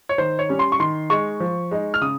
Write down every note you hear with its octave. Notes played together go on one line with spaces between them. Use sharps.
C#5
D#3 C5
C#5
G3 C#4
C6
C#6
D#3 C6
G#3 D#4 C#6
F3
G#3 D#4
F6
C#3 D#6